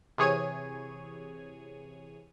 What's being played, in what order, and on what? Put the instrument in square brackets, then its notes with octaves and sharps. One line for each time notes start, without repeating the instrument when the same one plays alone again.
[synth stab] C3 E3 G#4 C#5 G#6 D#7